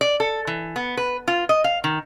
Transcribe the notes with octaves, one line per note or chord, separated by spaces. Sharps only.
D5
A4
E3
B3
B4
F4
D#5
F5
D#3